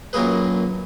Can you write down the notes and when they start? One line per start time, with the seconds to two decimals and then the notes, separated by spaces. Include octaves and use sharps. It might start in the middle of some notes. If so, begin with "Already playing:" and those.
0.13 F#2 A#2 F#3 A#3 G#4 B4